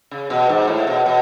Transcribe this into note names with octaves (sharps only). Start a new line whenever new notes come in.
C#3
B2
G#2
A2
B2
B2